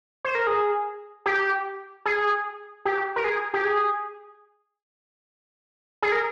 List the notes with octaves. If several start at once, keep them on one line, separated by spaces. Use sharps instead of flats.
C5
A#4
G#4
G4
G#4
G4
A#4
G#4
G4
G#4
G#4
A#4